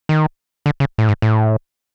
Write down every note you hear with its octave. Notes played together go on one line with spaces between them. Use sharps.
D#3
D3
C#3
A2
G#2
A2